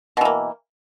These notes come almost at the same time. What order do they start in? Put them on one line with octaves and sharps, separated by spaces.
B2 E3 A#3